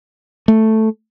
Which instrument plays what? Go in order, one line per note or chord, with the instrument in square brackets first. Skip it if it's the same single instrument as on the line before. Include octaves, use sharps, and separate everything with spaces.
[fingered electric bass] A3